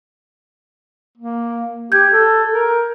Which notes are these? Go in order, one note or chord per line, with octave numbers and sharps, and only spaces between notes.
A#3
G4 G6 G#6
A4
A#4